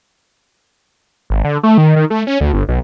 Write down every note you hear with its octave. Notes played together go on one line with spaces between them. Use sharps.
G#1
D3
A3
D#3
D#3
A3
C#4
D2
G1
B1